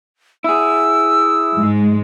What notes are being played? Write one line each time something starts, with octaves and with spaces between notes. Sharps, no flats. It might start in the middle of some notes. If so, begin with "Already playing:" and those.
E4 G#4 E6
G#2 G#3